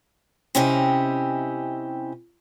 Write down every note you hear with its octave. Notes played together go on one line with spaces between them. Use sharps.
C3 C#4 E4 G4 D#5